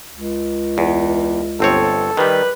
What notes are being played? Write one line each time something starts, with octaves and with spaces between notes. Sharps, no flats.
C#2
E2
G1 C4 A4 C#5
D#3 G3 B4